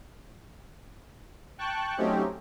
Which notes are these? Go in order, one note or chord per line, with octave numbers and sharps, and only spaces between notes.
G5 A5 C#6 F#6
F#3 A3 C4 C#4 D#4 G4